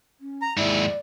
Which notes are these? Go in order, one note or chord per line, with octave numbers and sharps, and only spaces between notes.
C#4
A#5
D#2 G#2 E4 D5